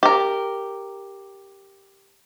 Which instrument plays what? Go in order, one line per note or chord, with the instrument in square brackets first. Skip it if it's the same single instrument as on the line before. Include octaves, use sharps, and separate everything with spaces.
[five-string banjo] G4 A#4